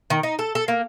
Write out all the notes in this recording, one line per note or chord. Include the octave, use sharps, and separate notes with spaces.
D#3
D#4
A4
A4
A#3